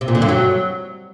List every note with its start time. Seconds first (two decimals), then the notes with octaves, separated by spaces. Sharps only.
0.01 C3
0.08 A#2
0.15 D3
0.22 G2
0.29 F#3